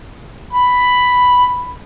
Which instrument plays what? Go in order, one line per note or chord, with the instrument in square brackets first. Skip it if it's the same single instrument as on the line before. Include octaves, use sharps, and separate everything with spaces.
[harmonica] B5